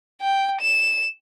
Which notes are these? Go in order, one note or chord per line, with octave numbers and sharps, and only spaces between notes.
G5
E7